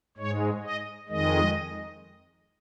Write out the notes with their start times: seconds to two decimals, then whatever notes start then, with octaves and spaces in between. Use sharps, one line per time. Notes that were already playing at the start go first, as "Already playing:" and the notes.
0.17 G#2 G#3 C#5
0.63 D#5
1.08 F2 D#3 G#3 D#5